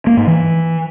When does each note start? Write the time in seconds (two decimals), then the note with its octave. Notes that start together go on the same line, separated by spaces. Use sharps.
0.07 A#3
0.17 G#2
0.27 E3